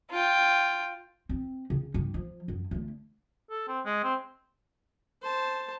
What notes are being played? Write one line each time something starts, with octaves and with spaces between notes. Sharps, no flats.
F4 G5
C4
C#3
G2
F3
F#2
D3 A3
A4
C4
G#3
C4
C5 A5